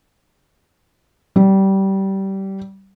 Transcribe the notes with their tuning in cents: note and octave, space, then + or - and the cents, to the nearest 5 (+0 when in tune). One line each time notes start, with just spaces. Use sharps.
G3 -20